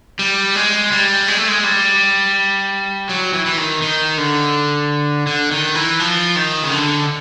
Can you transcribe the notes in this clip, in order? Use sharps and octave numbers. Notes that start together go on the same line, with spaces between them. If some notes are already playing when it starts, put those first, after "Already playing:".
G3
G#3
G3
G#3
A3
G#3
G3
F#3
E3
E3
D#3
D#3
D3
D3
D#3
E3
F3
D#3
C#3
D3